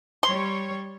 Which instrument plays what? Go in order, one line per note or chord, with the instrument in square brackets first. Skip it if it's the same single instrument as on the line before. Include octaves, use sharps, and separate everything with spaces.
[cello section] G3 C#5 [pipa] C6